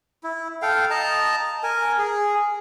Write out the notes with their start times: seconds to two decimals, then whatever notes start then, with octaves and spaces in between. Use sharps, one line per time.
0.24 E4
0.62 A4 F5 G5
0.90 D#5 A5 A#5
1.63 A#4 G#5
1.98 G#4